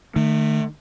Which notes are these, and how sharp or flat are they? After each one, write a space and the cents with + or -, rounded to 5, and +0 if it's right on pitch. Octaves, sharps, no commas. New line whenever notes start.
D#3 -40 A3 +0